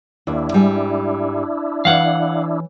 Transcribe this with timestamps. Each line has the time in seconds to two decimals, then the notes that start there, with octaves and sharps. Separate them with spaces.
0.27 D#2 D4 E4
0.52 G#2 G3 G#5
1.85 E3 C#5 F5 F#5